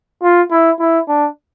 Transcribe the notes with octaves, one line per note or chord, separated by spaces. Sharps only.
F4
E4
E4
D4